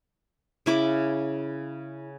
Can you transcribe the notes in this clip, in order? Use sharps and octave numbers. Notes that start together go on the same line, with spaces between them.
C#3 E4 D6